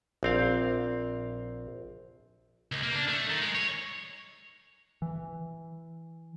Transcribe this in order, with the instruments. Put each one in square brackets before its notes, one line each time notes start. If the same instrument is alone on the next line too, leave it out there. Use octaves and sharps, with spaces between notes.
[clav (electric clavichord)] A#1 C4 F5
[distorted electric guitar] C#2
A#3
D4
A3
D#3
G#3
C#5
[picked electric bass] E3